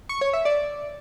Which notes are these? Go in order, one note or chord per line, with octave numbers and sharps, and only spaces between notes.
C#6
C#5
E5
D5